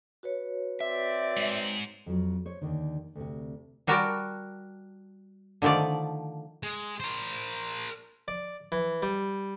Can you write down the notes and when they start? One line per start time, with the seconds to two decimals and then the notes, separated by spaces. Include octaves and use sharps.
0.23 F#4 B4 C#5
0.80 C4 D5 E5
1.37 G#2
2.06 F2 F3 F#3
2.45 C5 C#5
2.62 D#2 D3 D#3
3.15 D2 C3
3.87 G3 F#4 A#4 G5 A5
5.62 D3 D#3 F3 A3 D5
6.63 G#3
7.00 A#4 C5
8.28 D5
8.72 E3
9.02 G3